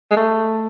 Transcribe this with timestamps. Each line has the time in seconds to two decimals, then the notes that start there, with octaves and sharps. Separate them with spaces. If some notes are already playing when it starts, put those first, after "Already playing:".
0.11 G#3
0.16 A3